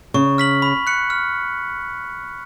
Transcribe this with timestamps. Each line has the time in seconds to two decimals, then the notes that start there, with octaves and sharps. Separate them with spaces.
0.14 C#3 C#6
0.38 F6 B6 F#7
0.62 B5
0.87 F#6 C#7
1.10 F6